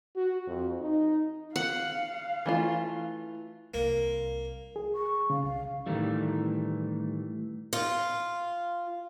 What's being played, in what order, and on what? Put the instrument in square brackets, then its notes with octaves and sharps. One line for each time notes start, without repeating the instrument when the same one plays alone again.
[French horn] F#4
F2
D#4
[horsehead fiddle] F5 [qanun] F#5
[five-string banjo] E3 A3 F4
[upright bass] C2 [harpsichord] A#3
[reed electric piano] G#4
[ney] C#6
[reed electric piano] C#3 [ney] F5
[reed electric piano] C2 [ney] F5
[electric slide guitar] A2 D#3 G3 [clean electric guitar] E3 A3
[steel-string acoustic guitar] F4